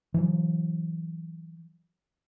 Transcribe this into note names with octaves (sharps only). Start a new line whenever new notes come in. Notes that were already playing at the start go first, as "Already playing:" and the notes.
E3 F#3